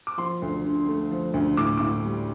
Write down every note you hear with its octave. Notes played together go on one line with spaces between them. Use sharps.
D6
F3 C6
D2
D3
A3
F3
D2
A2 D6
A2 D6
G3